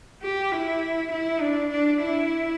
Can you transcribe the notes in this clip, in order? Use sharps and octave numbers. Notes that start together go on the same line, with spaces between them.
G4
E4
E4
D4
D4
E4